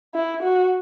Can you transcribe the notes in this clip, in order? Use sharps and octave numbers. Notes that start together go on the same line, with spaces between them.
E4
F#4